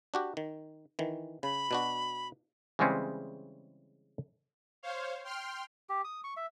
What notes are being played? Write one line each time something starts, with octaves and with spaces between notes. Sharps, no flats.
D4 F#4 G4
D#3
D#3 E3
C#3 B5
B2 D4 F#4
C#3 E3 G3 G#3 C4 C#4
C5 C#5 F5
G5 C6 F6
G4
D#6
C#6
E5